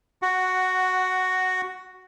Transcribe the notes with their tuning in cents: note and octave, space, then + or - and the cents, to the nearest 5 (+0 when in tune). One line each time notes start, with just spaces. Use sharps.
F#4 +0 F#5 +10